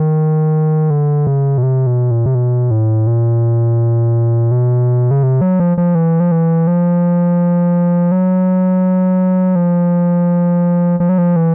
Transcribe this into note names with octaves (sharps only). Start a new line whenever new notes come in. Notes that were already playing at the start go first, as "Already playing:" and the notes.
Already playing: D#3
D3
C#3
B2
C3
B2
A#2
C3
B2
A2
A#2
B2
C#3
C3
F#3
F3
F3
E3
F3
E3
F3
F#3
F3
F3
F#3
F3
E3